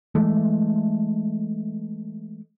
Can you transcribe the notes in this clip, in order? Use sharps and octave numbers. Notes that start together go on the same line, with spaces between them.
E3 G#3 A3